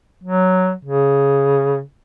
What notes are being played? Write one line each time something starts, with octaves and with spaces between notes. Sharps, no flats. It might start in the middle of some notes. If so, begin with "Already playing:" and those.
F#3
C#3